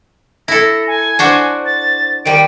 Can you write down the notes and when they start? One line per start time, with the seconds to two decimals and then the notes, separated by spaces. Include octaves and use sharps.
0.48 E4 A4 A#6
0.87 G#5
1.19 D4 F#4 C5
1.66 A6
2.26 D#3 G3 D7